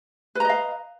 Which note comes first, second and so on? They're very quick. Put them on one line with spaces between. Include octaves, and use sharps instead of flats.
B4 A#5 D#5 F5